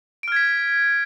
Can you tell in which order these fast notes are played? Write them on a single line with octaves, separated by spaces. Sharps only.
D7 F6 G#6 B6